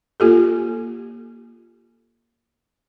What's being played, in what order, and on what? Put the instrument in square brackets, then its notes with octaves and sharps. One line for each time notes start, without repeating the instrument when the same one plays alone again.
[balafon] A#3 F4 G4 A4